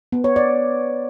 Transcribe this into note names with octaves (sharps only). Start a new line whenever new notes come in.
B3
C#5
D5